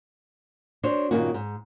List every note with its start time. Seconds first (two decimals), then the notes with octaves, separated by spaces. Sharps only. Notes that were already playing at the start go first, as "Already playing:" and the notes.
0.83 D4 F#4 C5 C#5
1.11 G2 A#2 D#3 A#3 C#4 F#4
1.34 G#2